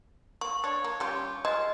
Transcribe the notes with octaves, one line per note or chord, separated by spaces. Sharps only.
A#3 C#6
D4 C#5
A#3
G3 C#4 F4 G4
G#3 F4 D#5